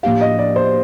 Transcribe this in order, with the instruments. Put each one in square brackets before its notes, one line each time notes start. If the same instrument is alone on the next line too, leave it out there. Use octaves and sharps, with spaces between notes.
[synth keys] A2 F3 A#3 D4 G4 [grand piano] F5
[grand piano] D#5
D5
C5